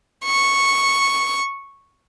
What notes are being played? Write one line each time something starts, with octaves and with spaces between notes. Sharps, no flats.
C#6